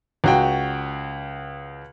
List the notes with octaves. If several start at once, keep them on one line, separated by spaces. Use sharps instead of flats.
C#2 F#4 G5